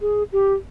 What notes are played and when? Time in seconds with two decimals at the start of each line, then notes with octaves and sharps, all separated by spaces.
0.01 G#4
0.32 G4